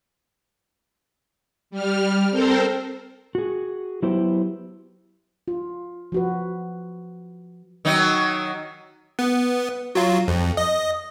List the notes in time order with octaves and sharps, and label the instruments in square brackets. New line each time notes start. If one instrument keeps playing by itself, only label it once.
[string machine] G3 F6
C4 A4 A#4 C5
[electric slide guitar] F#4 G#4
F#3 B3 E4 G4 C5
[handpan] F4
F3 F#4 B4
[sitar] D#3 F#3 D#4
[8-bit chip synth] B3
F#3 F4
F2
D#5